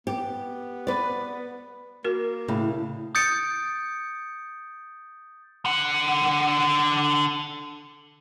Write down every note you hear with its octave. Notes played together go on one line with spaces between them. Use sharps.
B3 G4
B4 D5
A#3 F#4 A#4
A2 C#3
D#6 G6 A6 C#7 D7
D3 F#5